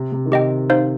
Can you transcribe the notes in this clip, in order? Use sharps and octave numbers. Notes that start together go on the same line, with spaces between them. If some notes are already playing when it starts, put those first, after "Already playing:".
Already playing: C3
C3
D#3
C3 G4 D#5 G5
D#4 C5 F5